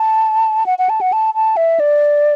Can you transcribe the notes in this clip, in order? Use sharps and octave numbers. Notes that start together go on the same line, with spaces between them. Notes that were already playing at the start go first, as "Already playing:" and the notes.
Already playing: A5
F#5
F#5
A5
F#5
A5
A5
E5
D5